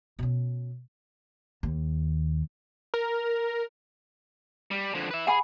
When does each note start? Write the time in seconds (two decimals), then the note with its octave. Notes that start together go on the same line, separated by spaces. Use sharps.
0.19 B2 C#4
1.63 D#2
2.94 A#4
4.71 G3
4.95 D3 F3
5.11 B4 E5
5.27 G#4 F#5 G#5 B5